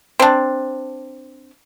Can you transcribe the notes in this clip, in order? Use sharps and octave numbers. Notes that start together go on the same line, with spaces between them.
C4 D4